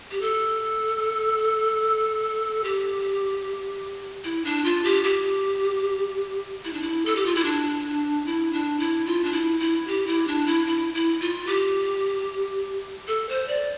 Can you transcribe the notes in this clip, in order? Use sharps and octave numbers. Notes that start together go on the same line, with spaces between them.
G4
A4
G4
E4
D4
F4
G4
G4
E4
D4
E4
A4
G4
F4
E4
D4
E4
D4
E4
F4
D4
E4
E4
G4
E4
D4
E4
E4
E4
F4
G4
A4
C5
D5